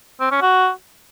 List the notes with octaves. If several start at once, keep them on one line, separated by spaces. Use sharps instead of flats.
C4
C#4
F#4